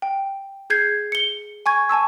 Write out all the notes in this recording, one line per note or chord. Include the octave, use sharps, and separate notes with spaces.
G5
G#4 G6 G#6 C7
C#7 G7
G#5 C#6 G#6
G#5 A5 C#6 E6